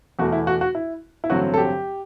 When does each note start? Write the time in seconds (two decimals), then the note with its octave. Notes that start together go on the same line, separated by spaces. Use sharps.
0.19 E2 B2 A3 F#4
0.32 E4
0.47 F#4
0.61 F#4
0.75 E4
1.24 E4
1.30 A1 G2 D3 F#3 C4 F#4
1.54 A4
1.58 G4